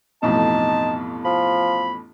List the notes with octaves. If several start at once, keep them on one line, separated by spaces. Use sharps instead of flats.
A1 F2 B2 D#4 A5
F3 B5